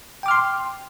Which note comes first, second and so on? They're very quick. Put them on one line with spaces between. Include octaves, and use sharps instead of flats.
G5 D6 F6 C6